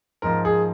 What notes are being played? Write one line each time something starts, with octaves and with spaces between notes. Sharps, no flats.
G#2 F3 A#3 A#4
G#4